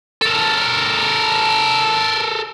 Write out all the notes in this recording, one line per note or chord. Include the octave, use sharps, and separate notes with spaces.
A4 A#4